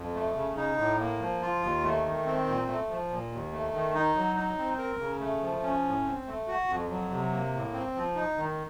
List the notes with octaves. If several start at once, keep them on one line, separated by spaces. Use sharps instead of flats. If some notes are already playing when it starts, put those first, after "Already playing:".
Already playing: F2
A3
C#3
D#4
A2
A#3
F3
F4
D#2
A3
D#3
C4
A#2
A3
F3
A#2
D#2
A3
D#3
D#4
F#3
D#4
C4
A#4
C#3
A3
F3
C#4
A2
C4
A3
F#4
F2
F#3
C3
A#3
A2
C4
F3
D#4
D#3